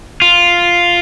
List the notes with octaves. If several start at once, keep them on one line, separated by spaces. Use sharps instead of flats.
F4